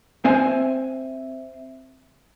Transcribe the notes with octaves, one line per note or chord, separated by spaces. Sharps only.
C4 E5 G#5